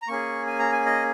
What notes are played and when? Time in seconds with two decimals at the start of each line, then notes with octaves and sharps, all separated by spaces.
0.02 A#5
0.08 A#3 C#4 G#4 C#6
0.47 G#5
0.59 A#5
0.72 G#5
0.86 D#5